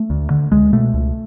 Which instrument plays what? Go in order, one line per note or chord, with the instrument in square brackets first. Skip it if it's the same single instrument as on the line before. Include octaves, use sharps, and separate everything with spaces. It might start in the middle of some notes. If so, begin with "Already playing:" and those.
Already playing: [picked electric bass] A3
D2
D3
C#2 G#3
B2 A3
C#2